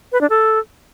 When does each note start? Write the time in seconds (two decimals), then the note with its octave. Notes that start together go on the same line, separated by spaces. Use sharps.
0.12 B4
0.21 D4
0.30 A4